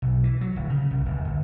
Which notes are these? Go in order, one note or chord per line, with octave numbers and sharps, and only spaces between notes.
B1
E3
F#3
D1
C#3
C2
D1
G1